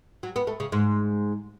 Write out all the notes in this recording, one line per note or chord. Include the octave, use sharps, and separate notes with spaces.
F#3
B3
A3
C#3
G#2